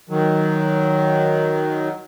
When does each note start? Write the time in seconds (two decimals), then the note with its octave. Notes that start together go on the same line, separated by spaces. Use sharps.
0.09 D#3 F#3